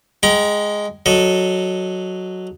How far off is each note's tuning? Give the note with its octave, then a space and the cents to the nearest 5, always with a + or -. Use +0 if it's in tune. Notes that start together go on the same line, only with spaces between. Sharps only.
G#3 +0 G5 -25 A#5 +25
F#3 +0 A4 +0 D#5 -10